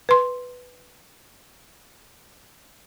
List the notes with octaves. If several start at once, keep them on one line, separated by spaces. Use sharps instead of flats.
B4 C6